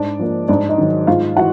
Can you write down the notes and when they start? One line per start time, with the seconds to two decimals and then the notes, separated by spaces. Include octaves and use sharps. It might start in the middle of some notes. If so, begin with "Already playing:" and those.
Already playing: G#2 D4 D5
0.19 F3 A#3
0.48 G#2 D4 D5
0.69 D#4 D#5
0.78 D#3 F#3
1.07 G#2 F4 F5
1.37 E3 F#4 F#5